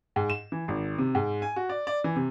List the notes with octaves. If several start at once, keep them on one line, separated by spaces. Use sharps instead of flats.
G#2
E7
E3
G#1
C3
G#2
G#5
F#4
D5
D5
E3
C3